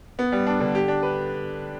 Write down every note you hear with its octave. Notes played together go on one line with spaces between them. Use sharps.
B3
G3
D4
D3
G4
D4
B4